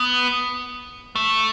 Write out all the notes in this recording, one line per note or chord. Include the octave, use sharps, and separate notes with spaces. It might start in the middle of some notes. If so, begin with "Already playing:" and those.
Already playing: B3
A3